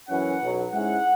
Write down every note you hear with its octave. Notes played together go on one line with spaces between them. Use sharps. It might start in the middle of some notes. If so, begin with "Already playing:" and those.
F#2 E3 C#4 F#5
B1 B2 F#3
G#2 G#3 C#4 E4 F#5